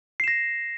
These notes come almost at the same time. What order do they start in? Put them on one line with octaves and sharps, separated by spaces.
C7 E7 A#6